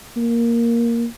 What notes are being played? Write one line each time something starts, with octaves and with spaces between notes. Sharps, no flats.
A#3